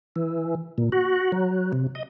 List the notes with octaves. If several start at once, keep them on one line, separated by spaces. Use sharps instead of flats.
E3
A#2
F#4
F#3
C3
D#5